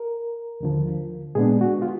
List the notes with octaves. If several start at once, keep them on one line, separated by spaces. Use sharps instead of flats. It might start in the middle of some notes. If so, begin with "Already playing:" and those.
Already playing: A#4
D#2 D3 F3
A#2 G#3 B3 D4 G#4
F#4
F4